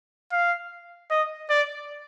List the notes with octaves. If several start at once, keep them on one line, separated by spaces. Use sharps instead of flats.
F5
D#5
D5